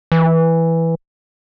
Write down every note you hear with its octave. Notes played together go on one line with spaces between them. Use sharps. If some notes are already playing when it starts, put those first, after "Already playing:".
E3